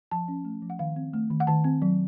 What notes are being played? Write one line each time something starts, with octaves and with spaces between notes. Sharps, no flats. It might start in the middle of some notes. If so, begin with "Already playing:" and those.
F3 A5
C#4
A3
F3
F#5
D#3 F5
C4
A3
D#3
F#5
D#3 A5
C4
F#3